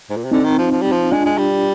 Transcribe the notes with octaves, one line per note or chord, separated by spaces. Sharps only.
G#2
A#2
C3
D3 C4 D#4
D#3
F3
F3
G3
F3
G#3 D4 F4
G#3
G3